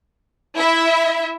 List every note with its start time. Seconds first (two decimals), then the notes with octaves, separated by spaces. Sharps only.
0.58 E4 E5